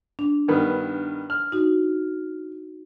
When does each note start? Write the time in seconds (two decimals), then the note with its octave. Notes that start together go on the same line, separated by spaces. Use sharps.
0.19 D4
0.48 G2 D#3 B3
1.30 F6
1.52 D#4 F#4